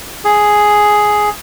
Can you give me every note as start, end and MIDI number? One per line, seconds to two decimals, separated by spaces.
0.25 1.29 68